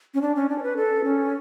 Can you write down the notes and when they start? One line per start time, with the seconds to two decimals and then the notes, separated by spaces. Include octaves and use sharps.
0.14 C#4
0.22 D4
0.36 C#4
0.49 D4
0.58 C#5
0.63 B4
0.77 A4
1.04 C#4